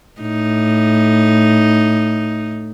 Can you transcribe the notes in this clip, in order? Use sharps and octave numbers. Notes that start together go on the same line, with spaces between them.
A2 D#4